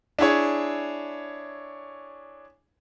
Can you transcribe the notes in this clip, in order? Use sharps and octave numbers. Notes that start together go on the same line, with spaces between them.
D4 E4 G#4 C#5